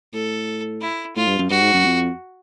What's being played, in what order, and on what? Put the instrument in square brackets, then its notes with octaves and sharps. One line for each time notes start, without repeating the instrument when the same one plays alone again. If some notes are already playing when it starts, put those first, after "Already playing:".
[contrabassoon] A2 [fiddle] A4
[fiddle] E4
[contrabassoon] A2 [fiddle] F4
[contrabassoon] G2
F#2
[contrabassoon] G2 [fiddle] F#4
[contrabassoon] G#2
F#2
F2